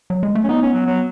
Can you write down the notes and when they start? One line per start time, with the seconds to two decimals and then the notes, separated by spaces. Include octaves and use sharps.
0.10 F#3
0.23 G#3
0.35 A3
0.44 C#4
0.49 B3 D#4
0.62 C#4
0.73 F#3
0.86 F#3